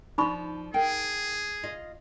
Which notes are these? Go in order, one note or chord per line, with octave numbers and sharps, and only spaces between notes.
F3 D4 D#4 B5 C#6
G#4 A#4 G5
F4 D#5